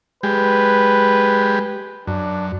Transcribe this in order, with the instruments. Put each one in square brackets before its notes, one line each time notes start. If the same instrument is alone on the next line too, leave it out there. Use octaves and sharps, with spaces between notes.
[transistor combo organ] G#3 G4 [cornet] B4
[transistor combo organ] F#2 [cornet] D4